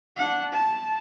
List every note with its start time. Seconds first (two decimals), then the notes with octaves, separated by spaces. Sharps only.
0.16 D4 F#5
0.52 A5